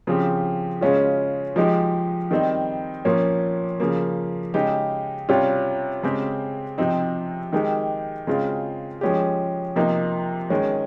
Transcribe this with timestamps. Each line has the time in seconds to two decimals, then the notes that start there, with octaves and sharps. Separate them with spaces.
0.07 C#3 F3 C4 G4
0.81 C#3 G#3 C#4 F4
1.56 F3 G#3 D#4 G4
2.31 D#3 G3 C4 D#4
3.05 A#2 F3 A#3 C#4
3.80 C#3 F3 A#3
4.54 C#3 G#3 D#4 G4
5.29 C3 G3 C#4 F4
6.03 C#3 G#3 C4 G4
6.78 C3 F3 C4 D#4
7.53 D#3 G#3 D#4 G4
8.27 C#3 G#3 C4 F4
9.01 F3 G#3 C#4 G4
9.76 C3 F3 A#3 D#4
10.50 D#3 G#3 C#4